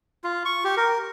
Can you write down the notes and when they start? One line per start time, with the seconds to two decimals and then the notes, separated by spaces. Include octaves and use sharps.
0.24 F4
0.45 C#6
0.65 G4
0.77 A#4